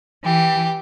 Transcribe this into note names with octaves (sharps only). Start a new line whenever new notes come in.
E3 G4